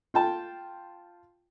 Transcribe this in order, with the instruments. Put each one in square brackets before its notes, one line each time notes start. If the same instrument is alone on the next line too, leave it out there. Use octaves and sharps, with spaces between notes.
[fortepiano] F4 G5 A5